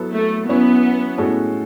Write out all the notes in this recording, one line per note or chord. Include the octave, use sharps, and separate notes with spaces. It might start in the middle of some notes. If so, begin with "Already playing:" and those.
Already playing: F#3 B3 E4 A4
A3
F#3 B3 C#4 E4
A2 G#3 C#4 F#4 A4